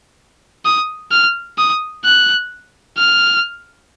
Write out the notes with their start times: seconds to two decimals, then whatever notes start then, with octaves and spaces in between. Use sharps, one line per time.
0.65 D#6
1.11 F6
1.58 D#6
2.05 F#6
2.97 F6